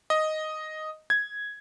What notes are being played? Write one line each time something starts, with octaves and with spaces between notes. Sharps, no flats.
D#5
G#6